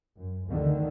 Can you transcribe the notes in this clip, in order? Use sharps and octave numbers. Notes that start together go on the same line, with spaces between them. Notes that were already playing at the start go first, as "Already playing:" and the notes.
F#2
D2 D3 D#3